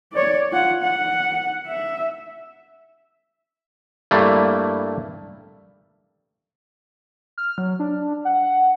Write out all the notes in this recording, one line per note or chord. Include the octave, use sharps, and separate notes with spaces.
C#5 D5
F4 F#5
F#5
E5
G2 G3 A3 A#3 E4
F6
F#3
D4
F#5